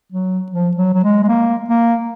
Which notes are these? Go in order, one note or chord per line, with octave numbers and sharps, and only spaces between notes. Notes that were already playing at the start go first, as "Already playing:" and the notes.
F#3
F3
F#3
F#3
G#3
G#3
A#3
A#3